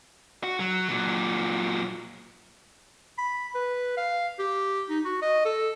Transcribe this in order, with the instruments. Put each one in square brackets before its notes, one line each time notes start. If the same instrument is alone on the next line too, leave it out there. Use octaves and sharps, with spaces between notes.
[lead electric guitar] F#4
F#3
A#2 F#3
[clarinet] B5
B4
F5
G4
D#4
F#4
D#5
A4